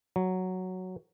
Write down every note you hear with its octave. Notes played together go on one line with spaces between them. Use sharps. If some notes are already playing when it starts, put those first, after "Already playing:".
F#3